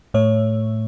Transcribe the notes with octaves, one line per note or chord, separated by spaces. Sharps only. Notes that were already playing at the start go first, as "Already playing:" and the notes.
A2 A3 C#5